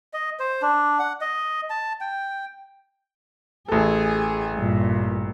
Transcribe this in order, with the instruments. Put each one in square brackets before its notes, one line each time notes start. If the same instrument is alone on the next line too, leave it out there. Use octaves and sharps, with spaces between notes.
[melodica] D#5
C5
D4
F#5
D#5
A5
G5
[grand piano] A1 A4 [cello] G#4
[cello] G2 A#2